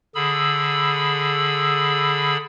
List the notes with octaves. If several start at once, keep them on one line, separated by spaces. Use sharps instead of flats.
D3 G#4 B5 E6